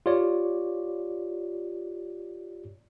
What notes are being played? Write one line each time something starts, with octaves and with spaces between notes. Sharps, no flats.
F4 G4 C#5 D5